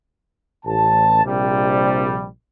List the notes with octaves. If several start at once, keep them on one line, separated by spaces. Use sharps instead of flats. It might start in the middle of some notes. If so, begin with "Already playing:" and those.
A1 A5
A#1 C3 G3